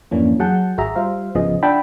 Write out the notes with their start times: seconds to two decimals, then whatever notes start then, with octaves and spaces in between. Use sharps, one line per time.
0.11 F2 G#2 E3 A#3 C#4 D4
0.39 F#3 G#4 F#5 A5 G6
0.78 G#1 F#4 G#4 E5 A#5
0.95 G3 F4 C5 E5 F5
1.35 G#1 C#3 F3 B3 G#4 D#5
1.63 D4 E5 F#5 G5 A5 B5